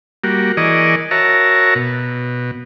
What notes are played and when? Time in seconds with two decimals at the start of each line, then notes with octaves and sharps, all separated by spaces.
0.24 G3 A#3 F#4
0.57 E3 G#4 A#4 D5 D#5 C#6
1.11 F#4 A#4 C#5 E5 A5 A#5
1.75 B2